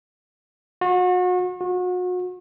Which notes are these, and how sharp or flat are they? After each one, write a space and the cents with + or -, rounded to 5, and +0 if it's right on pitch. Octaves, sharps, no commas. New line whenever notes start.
F#4 -35
F#4 -35